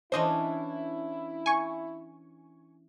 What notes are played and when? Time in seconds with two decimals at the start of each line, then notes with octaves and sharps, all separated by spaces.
0.12 E3 C#4 D4 E4 C5 D#5
1.46 G#5 C#6